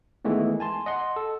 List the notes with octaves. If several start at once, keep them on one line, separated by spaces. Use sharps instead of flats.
D#3 E3 G#3 A3 B3
G#5 A5 C6
D#5 F#5 C6
A4